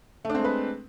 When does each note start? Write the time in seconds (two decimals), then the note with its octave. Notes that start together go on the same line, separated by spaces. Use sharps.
0.25 A3
0.30 D4
0.35 C4
0.40 G#3
0.45 B4